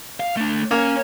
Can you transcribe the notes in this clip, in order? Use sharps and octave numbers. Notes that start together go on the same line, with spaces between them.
F5
A3 D4
A#3 C#4